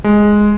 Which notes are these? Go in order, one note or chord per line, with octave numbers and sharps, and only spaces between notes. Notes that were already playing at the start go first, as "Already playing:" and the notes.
G#3